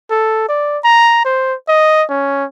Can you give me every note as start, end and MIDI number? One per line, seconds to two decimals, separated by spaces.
0.11 0.46 69
0.49 0.78 74
0.84 1.22 82
1.25 1.54 72
1.68 2.04 75
2.09 2.45 61